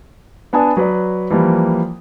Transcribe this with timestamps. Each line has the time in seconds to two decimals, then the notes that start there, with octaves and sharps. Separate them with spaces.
0.53 B3 D4 G#5 A5 D#6
0.77 F#3 B4 D5
1.30 E3 F3 G3 A#3